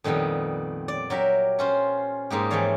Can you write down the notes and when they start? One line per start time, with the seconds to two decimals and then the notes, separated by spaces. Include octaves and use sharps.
0.04 F2 A#2 D#3 G3 B3
0.88 D5
1.10 F#3 G4 A#4 E5
1.59 C#4 F4 C5
2.30 G#2 A#3 D#4 G4
2.50 G#2 E3 F3 C#5 D5 F5